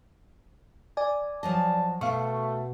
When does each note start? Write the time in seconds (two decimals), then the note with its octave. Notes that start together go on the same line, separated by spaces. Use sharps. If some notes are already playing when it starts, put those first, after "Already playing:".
0.97 D5 G#5
1.43 F3 F#3 D#5 A5
2.01 B2 A3 F5 C#6